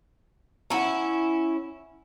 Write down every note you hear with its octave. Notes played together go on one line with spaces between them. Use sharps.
C#4 E4 F#5 G#5 A#5